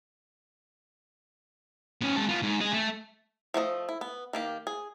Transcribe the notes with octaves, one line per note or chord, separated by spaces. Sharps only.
B3 C#4
G#3 A5
B3 F4
G#2
G#3 G#4
A3
F3 A3 F#4 D#5
E4
B3
D#3 A#3 G4
G#4